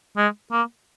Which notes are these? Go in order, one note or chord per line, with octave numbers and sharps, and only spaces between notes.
G#3
A#3